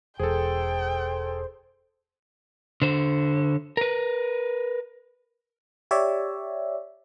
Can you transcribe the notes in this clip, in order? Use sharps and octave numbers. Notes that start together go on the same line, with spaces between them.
E1 G#4 A4 C5 G5
D3 C5
A#4 B4
G4 C#5 D5 E5